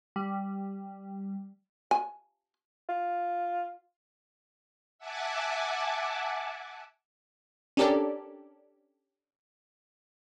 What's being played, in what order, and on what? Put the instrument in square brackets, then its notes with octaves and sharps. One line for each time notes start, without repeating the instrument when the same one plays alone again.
[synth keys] G3
[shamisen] G#5
[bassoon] F4
[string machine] E5 F#5 G#5 A5 D6
[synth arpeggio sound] C#4 D4 G4 A4 A#4 D5